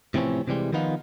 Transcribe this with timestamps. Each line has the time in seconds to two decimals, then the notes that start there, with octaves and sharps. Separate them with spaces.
0.14 A2 C3 E3 F3 C4 C#4
0.48 C3 E3 G3 G#3
0.72 D#3 F3 B3 D#4 F4